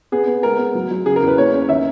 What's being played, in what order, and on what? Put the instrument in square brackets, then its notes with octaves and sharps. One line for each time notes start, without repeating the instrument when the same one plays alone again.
[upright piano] B3 G#4
B3
G#3 A#4
B3
F#3
F#3
C#3 G#4
A#4
E2
B4
A#3 C#5
C#4
D#3 E5